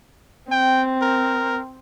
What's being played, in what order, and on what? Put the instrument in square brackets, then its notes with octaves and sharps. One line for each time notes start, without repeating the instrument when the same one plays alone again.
[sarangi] C4 [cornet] G5
[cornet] A#4